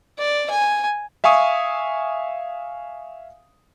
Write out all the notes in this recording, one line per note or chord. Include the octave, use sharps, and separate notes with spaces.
D5
G#5
E5 F5 G#5 C#6 D#6